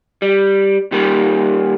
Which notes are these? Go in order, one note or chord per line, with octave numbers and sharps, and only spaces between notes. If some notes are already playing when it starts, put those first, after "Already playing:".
G3
D#3 G3 A#3